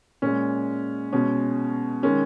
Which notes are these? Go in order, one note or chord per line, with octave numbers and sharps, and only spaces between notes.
A#2 G#3 C#4
B2 G#3 C#4
D#3 G#3 C#4